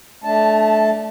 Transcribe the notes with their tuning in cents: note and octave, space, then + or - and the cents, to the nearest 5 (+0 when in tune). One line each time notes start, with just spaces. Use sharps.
A3 -20 D4 -5 A5 +0